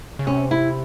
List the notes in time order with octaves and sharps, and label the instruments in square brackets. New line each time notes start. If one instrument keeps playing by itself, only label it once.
[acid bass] C#3
[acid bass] C3 [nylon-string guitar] C#4
[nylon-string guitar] E4